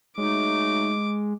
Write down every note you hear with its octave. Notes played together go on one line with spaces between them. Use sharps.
F#3 G#3 A3 D#4 D6